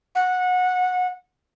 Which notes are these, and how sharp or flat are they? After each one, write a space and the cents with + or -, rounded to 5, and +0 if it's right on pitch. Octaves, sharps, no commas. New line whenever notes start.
F#5 -20